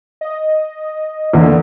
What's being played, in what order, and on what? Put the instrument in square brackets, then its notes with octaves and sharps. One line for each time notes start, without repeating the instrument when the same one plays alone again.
[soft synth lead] D#5
[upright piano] E2 D3 [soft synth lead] A#3